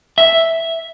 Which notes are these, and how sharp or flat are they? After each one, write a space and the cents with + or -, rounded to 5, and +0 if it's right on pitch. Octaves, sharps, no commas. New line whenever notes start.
E5 +0